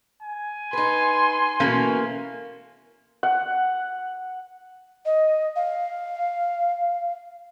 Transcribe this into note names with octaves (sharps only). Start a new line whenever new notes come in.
G#5
D#4 B4 C6
B2 E3 A3 A#3 C#4
F#5
D#5
F5